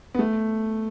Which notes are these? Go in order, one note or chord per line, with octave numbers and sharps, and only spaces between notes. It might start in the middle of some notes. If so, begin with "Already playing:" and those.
B3
A3